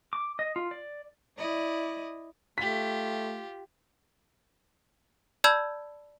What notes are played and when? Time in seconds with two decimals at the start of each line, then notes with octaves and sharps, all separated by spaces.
0.13 D6
0.39 D#5
0.56 F4
0.71 D5
1.38 E4 D5 D#5
2.58 A3 F4 G4 B6
5.44 D5 A5 B5 E6 G6 G#6